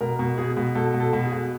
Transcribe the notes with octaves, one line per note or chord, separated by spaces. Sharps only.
B2 A#4
B2
B2 G#4
B2
B2 A4
B2
A4
B2
G#4
B2